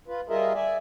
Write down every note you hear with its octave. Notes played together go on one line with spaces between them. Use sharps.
F4 B4
G3 F4 G#4 A#4 D#5 E5
D5 E5 G#5